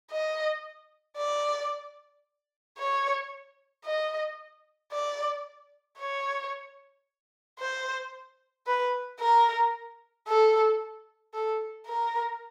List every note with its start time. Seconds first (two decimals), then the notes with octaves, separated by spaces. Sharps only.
0.11 D#5
1.17 D5
2.78 C#5
3.85 D#5
4.92 D5
5.98 C#5
7.60 C5
8.67 B4
9.20 A#4
10.27 A4
11.34 A4
11.86 A#4